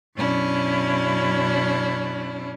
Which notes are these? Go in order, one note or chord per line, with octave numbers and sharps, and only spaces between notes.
F#2 B2 C#4 D4 E4